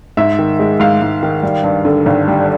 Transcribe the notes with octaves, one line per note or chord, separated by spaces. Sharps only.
G#2 E5
D#3
G#3
G#2 F5
G#2
D#3
G3
G2
D3
G#1
G3